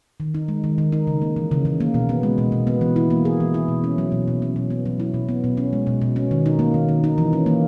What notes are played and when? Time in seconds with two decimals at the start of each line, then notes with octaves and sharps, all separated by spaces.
0.20 D#3
0.34 D#4
0.48 G#3
0.64 D#3
0.78 D#3
0.92 D#4
1.07 C#3
1.22 A#3
1.36 E3
1.51 C#3
1.65 C#3
1.80 A#3
1.94 B2
2.09 B3
2.23 G#3
2.38 B2
2.52 B2
2.67 B3
2.81 E3
2.96 E4
3.10 A#3
3.25 G#4
3.40 E3
3.54 E4
3.68 B2
3.84 C#4
3.98 F#3
4.12 B2
4.28 B2
4.42 C#4
4.56 B2
4.70 B3
4.86 F#3
5.00 E4
5.14 B2
5.29 B3
5.44 B2
5.57 C#4
5.73 G#3
5.87 B2
6.02 B2
6.16 C#4
6.31 D#3
6.46 D#4
6.59 A#3
6.74 D#3
6.89 D#3
7.04 D#4
7.18 E3
7.33 C#4
7.46 A#3